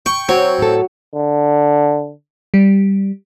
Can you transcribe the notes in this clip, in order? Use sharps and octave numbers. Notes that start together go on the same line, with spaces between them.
G5 C#6
F#3 C4 C#5
A2 A4
D3
G3